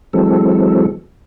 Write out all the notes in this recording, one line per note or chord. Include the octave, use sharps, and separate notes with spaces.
E3 F#3 G#3 C4 A4